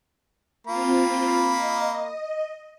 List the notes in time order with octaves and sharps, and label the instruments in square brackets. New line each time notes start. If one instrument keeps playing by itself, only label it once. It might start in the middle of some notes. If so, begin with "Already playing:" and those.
[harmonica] A#3 B5 [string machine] C4 F4
[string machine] D#5